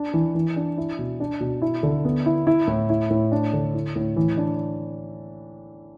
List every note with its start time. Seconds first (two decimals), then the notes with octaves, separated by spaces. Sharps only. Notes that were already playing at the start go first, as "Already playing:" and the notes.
Already playing: D4
0.14 E3
0.35 E3
0.56 D4
0.78 E4
0.99 B2
1.20 D4
1.40 B2
1.62 E4
1.83 D3
2.05 B3
2.26 E4
2.47 E4
2.68 A2
2.90 E4
3.10 A2
3.32 D4
3.53 D3
3.74 E4
3.96 A2
4.16 E3
4.37 D4